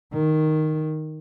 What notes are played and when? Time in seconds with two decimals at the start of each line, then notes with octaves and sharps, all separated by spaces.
0.13 D#3